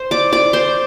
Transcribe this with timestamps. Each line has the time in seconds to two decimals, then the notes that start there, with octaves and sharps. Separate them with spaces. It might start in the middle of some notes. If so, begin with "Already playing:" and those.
Already playing: C5 C6
0.11 D5 D6
0.33 D5 D6
0.53 C5 C6